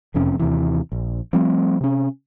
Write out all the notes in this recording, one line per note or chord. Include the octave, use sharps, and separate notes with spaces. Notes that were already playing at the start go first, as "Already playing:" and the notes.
E1 F2 C3 C#4
D#2 C3 E3
A#1
F3 G3 A3 C4
C3 C#4